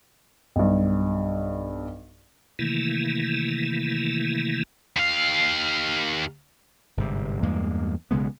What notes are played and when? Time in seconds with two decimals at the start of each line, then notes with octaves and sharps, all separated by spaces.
0.56 B1 G2
2.59 C3 D#3 E3 A3 A#3 E4
4.97 D#2 F5
6.97 G1 G#2 C3
7.43 E2 G2 G#3 A#3
8.11 B1 C#3 G#3 B3